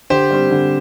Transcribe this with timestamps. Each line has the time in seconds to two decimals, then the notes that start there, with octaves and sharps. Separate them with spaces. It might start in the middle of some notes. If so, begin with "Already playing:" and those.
0.10 D3 G4 C5
0.31 G3 C4
0.50 D3